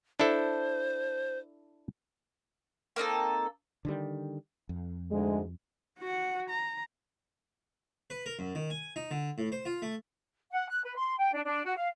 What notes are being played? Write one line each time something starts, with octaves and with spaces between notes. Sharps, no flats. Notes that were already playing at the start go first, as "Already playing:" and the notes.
D4 E4 A4 C5
A#3 C4 D#4 A4
D3 D#3 G3
F2
D2 G#2 G#3
F#4 F#5
A#5
B4
A#4
F#2
D#3
G#5
D#4
D3
A2
C5
F4
A3
F#5
F#6
B4
C6
G5
D4
D4
F#4
F5